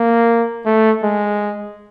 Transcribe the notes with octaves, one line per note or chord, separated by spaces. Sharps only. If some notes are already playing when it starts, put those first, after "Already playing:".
Already playing: A#3
A3
G#3